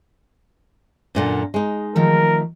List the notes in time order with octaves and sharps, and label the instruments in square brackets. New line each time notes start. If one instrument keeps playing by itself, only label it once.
[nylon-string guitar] F#2 A#2 D3
G#3 D#4
[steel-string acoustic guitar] D#3 F3 A3 [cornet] A#4